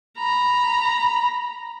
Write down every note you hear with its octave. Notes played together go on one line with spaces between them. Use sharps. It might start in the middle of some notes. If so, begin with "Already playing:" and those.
A#5 B5